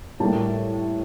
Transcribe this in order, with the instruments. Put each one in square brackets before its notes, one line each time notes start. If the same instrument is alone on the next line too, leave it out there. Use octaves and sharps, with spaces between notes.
[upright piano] A2 G3 A#3 A5